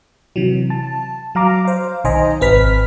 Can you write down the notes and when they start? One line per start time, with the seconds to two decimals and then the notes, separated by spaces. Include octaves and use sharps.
0.36 C3 E3 F#3
0.70 A5
1.35 F#3 F5 A#5 D6
1.65 C5 F5
2.04 B1 D#3 C5 D#5 G#5 A#5
2.41 G#1 C4 B4 F6 B6